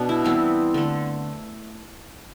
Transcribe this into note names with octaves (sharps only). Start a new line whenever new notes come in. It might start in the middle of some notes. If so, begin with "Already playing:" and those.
Already playing: B2 B3 D4
E4
E3 G3 B3 C4
D3 A3